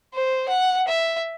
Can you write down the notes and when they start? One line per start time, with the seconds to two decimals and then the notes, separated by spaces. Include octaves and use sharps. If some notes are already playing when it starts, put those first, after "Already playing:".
0.14 C5
0.49 F#5
0.88 E5